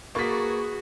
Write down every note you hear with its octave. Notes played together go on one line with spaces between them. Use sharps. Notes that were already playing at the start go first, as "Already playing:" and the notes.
A#3 F#4 G#4 B4 C#6 A6 B6